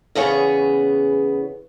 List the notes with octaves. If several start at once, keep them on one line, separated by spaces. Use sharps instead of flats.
E2 C#3 B3 G#4 C#5